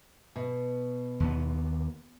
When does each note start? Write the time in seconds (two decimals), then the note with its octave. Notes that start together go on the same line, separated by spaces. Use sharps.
0.36 B2
1.20 D#2 B3